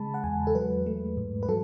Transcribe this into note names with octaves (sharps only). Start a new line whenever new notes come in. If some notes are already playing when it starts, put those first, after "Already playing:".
Already playing: C#3 G#3 A5 B5
F#5
E2 G#5
A4
F#3 B4
A3
G#2
B4
F#3 A4